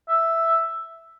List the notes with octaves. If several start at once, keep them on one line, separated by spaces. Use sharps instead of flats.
E5